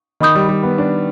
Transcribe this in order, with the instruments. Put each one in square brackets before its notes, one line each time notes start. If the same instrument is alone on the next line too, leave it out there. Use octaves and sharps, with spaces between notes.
[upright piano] D#3 [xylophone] D#5 B5 D#6 G6
[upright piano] G3
G3
B3
D4